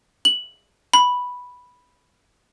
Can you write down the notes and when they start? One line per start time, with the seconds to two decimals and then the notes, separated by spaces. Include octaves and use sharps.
0.25 F#7
0.94 B5